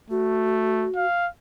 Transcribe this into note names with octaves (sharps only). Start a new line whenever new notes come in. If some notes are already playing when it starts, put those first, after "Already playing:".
A3 F#4
F5